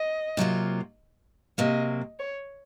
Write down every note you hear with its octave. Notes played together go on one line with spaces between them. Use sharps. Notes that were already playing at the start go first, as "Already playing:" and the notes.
Already playing: D#5
C3 F#3 A#3 F4
C3 F#3 A#3 D#5
C#5